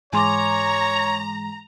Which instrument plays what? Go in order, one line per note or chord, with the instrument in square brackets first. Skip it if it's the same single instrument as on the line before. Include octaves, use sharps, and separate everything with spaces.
[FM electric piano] G#2 E3 G#3 [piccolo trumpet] C#5 [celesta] G#5 C6 D6 [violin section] A#5